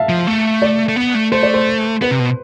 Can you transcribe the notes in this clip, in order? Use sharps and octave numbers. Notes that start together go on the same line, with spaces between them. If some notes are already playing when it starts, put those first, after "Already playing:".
Already playing: E5 F5 A5
F3
A3
D5
A3
B3
A3
A3 C5
D5
C5
B3 B4
C3
B2